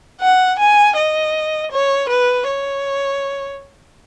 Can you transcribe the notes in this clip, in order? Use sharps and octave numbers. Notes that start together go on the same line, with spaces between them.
F#5
G#5
D#5
C#5
B4
C#5